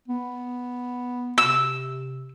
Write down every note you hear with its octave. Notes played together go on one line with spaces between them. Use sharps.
B3
C3 E6